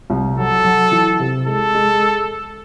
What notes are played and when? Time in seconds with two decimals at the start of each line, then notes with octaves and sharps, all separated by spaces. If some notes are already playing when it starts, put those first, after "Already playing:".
0.10 C2
0.38 F#3 A4
0.64 F#3
0.92 E3
1.19 C3
1.47 G#3 A4
1.74 G#3